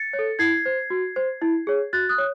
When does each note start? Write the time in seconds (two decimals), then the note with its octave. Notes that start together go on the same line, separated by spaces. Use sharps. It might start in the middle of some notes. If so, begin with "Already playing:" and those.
Already playing: A6 C#7
0.13 C#5
0.19 A4
0.39 E4 G#6 C7
0.66 C5
0.90 F#4
1.16 C5
1.42 E4
1.67 G#4 C#5
1.93 F#4 F#6 A6
2.09 D#6 F#6
2.18 C#5